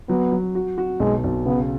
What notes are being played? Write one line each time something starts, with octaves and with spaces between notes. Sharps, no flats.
F#3 B3
F#3
F#4
F#4
B1 G#3
B1
C#3 B3